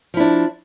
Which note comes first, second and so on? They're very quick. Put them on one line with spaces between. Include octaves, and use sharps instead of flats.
F3 E4 D4